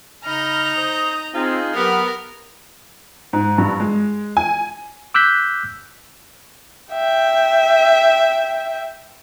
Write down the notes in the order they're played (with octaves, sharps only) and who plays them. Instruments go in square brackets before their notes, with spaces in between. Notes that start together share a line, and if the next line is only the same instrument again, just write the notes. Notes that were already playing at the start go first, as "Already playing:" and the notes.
[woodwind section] C#3 B5 F6 [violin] D#4 A#5
[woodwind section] C5 D#6
[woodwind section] C4 [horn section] D#4 F4 G#4
[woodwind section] F#3 G4 F6 [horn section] B3 [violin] A#4
[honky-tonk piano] G#2
G2
G#3
G#5
[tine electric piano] D6 E6 F#6 G6 B6
[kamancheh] E5 G5